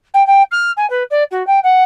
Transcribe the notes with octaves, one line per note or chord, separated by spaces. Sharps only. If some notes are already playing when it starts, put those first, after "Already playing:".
G5
G5
F6
G#5
B4
D5
F#4
G5
F#5